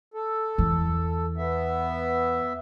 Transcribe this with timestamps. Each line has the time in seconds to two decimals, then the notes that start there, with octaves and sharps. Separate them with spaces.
0.14 A4
0.58 E2
1.37 B3 E5